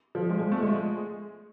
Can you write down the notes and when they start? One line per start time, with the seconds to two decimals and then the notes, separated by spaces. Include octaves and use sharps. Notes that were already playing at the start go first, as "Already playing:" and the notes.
0.15 F3
0.29 G#3
0.40 G#3
0.52 A3
0.63 G#3